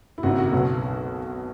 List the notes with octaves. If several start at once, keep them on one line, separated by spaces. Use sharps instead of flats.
E4
G#1 F#2 C#3 F#4
F#4
B1 B2 F#3